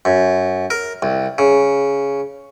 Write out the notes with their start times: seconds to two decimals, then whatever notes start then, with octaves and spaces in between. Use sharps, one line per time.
0.05 F#2
0.70 A#4
1.02 C2
1.38 C#3